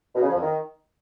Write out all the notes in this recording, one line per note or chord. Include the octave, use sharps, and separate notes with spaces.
B2
C#3
F3
F2
D#3